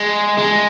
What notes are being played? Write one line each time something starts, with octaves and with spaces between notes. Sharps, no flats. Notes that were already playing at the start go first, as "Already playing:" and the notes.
Already playing: G#3
G#3